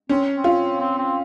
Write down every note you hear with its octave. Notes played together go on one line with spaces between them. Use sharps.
C4 C#4
C4
F4
C4
C4